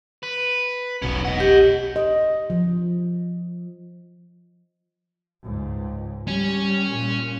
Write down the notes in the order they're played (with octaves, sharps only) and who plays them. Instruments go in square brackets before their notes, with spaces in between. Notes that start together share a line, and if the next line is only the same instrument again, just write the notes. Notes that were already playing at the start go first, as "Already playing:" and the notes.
[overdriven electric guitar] B4
[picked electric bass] E1 B1 [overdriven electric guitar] B3 C#4
[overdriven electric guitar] D#5 F#5
[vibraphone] G4
[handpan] D#5
F3
[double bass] C#2 G#2
[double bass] G3 [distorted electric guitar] C#4
[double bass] A#2